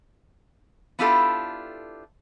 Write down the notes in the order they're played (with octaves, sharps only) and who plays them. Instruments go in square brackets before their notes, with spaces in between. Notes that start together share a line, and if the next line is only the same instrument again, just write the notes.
[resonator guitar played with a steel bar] B3 D4 E4 F4 G4 A4